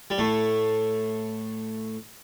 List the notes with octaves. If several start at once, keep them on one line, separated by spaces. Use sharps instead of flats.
G3
A2 A3